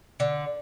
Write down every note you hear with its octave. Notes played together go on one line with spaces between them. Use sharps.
D3